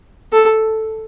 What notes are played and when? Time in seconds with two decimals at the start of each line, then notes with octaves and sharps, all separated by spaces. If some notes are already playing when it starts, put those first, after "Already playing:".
0.33 A4